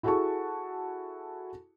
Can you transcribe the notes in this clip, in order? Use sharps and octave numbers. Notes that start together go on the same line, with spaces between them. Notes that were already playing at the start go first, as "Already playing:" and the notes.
E4 F#4 G#4 A4 A5 C#6